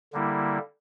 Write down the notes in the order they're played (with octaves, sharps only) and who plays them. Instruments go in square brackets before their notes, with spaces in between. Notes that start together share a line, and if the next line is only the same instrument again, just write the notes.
[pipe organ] D3 G3 A#3 E4